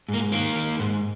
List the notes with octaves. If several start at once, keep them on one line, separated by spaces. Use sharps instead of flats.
G#2 A#3
D#3 A#3
D#3
G#2